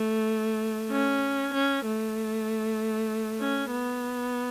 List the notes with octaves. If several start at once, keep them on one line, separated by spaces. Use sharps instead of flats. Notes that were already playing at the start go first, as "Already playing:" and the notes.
Already playing: A3
C#4
C#4
A3
C#4
B3